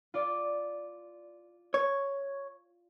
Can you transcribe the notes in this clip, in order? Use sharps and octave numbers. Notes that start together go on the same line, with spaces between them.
F4 D5
C#5